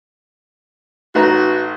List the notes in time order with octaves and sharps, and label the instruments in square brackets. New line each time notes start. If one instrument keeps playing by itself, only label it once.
[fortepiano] A1 A#5 [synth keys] D#4 B4 [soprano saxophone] F#4